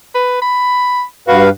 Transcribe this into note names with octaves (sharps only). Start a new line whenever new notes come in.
B4
B5
G2 F#4 B4 F5